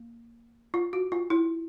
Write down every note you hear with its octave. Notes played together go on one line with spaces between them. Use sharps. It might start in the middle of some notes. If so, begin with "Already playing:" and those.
Already playing: A#3
F4
F#4
F4
E4